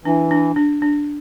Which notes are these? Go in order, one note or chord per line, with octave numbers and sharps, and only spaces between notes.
E3 D4
D4
D4
D4